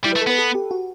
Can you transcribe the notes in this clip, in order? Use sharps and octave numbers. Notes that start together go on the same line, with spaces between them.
G3 E4
B4
A3
A4
B3 B4
A4
G4
F#4